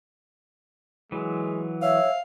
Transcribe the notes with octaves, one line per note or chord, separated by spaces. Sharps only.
E3 F#3 G#3
C#5 E5 F5